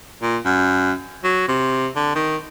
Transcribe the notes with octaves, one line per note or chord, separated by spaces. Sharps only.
A#2
F#2
F#3
C3
D3
D#3